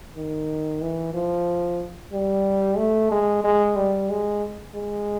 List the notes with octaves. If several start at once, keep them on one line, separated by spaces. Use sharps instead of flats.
D#3
E3
F3
G3
A3
G#3
G#3
G3
G#3
G#3